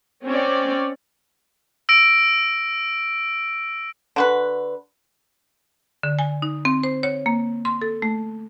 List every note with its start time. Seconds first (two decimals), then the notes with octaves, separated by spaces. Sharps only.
0.24 C4 C#4 C#5 D5
1.89 E6 A#6 D7
4.16 D3 F#4 B4
6.03 D3
6.19 G#5
6.42 D#4
6.65 C4
6.83 C5
7.03 C#5
7.26 A#3
7.65 C6
7.82 A4
8.02 A3